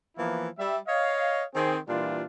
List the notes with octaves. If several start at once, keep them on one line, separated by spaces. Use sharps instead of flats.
E3 F3 A#3 B3 E4 F4
G3 E5
C#5 D#5 F5
D#3 C4 G#4
A#2 E3 G3 D4 F4